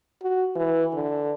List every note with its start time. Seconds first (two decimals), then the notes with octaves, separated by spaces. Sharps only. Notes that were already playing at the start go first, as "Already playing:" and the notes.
0.22 F#4
0.55 E3
0.93 D3